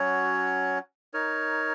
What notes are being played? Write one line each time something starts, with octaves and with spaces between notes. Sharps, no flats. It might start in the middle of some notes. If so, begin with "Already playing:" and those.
Already playing: F#3 C#4 F#4 C#5
D#4 A#4 C#5